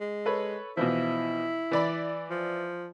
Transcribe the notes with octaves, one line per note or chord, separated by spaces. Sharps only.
G#3
A4 B4 C#5
B2 E3 F3 E4
E3 D5 B5
F3